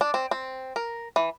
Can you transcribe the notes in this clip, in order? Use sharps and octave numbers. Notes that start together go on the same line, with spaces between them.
D4
C4
C4
A#4
E3